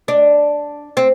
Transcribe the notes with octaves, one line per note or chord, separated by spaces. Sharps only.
D4
C4